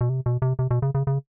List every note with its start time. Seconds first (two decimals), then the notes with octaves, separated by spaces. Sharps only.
0.01 B2
0.09 C3
0.26 B2
0.42 C3
0.59 C3
0.71 B2
0.82 C#3
0.95 C#3
1.07 C#3